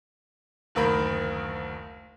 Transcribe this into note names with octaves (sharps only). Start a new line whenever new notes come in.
F#1 D2 D#3 A#4 B5